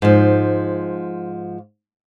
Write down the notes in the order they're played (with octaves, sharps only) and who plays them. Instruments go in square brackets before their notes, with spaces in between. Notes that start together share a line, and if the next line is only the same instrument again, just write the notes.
[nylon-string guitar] G#2 F3